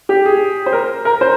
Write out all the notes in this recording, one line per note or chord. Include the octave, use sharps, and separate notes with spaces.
G4
G#4
C5
A#4
A#4
C5